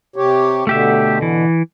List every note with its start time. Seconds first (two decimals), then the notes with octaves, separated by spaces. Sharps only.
0.16 C3 G4 C#5
0.67 B2 D3 A3 G4 E5
1.22 E3